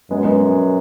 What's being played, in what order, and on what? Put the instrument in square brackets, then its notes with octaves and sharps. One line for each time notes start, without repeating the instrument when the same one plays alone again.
[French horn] F#2 [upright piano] G#3 B3
[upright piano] G#3 B3